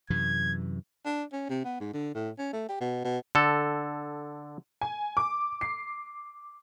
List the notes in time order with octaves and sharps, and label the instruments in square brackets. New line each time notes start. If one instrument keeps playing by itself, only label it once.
[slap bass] F#2 C3 E3 [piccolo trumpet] G#6
[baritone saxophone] D4
C#4
C3
B3
G#2
D3
A2
C#4
A3
G4
B2
B2
[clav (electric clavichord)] D3 A4
[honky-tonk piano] G#5
D6
C7